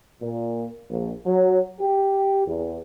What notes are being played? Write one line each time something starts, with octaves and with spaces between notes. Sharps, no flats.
A#2
A#1
F#3
G4
E2